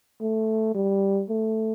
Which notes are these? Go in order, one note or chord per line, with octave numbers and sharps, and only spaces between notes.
A3
G3
A3